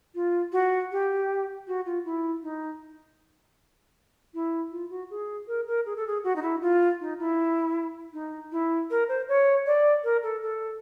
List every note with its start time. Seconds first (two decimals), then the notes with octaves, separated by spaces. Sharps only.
0.15 F4
0.52 F#4
0.91 G4
1.67 F#4
1.85 F4
2.05 E4
2.43 D#4
4.34 E4
4.71 F4
4.90 F#4
5.10 G#4
5.47 A#4
5.67 A#4
5.86 G#4
5.96 A4
6.07 G#4
6.24 F#4
6.36 D#4
6.42 E4
6.61 F4
7.00 D#4
7.19 E4
8.13 D#4
8.52 E4
8.90 A#4
9.08 C5
9.28 C#5
9.66 D5
10.04 A#4
10.23 A4
10.42 A4